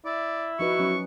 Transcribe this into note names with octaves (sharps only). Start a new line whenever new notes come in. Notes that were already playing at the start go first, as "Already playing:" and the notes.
E4 D5
F3 D#4 F#4 B4 C#6
F#3 C#4